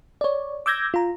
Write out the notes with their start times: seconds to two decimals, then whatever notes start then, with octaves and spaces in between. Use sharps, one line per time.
0.21 C#5 D5
0.66 D6 E6 G6 G#6 A#6
0.94 F4 A#5